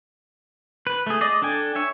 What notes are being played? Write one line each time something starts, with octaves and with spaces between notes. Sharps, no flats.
B4
A3 G#4
G#4 D5 D#5
D4 A4 G5 G#5
C#5 E5 G#5